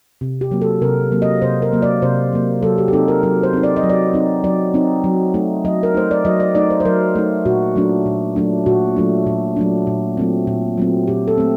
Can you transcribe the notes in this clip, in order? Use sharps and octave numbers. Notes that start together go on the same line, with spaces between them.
C3
G4
F#3 A#3
A4
C3 A#4
F#3 A#3
D#5
C3 C5
A#4
F#3 A#3
D5
C3 C5
F#3 A#3
F#3 A4
G4
G4
C4 D#4 A4
A#4
F#3 A#4
C5
C4 D#4
D5
D#5
F#3
D5
C4 D#4
F#3 D5
C4 D#4
F#3
A3 D#4
F#3 D#5
A#4
A3 D#4 C5
D5
F#3 D#5
D5
A3 D#4 D5
C5
C5
F#3 A#4
A3 D#4
A#2 F#4
F#3 A3 D4
A#2
F#3 A3 D4
A#2 F#4
F#3 A3 D4
A#2
F#3 A3 D4
A#2
F#3 A3 C4
A#2
F#3 A3 C4
A#2 G4
A4
A3 C4